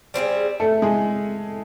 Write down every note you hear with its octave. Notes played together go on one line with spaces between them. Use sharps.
G3 C4 E4 G#4
A3 A4
G#3 G#4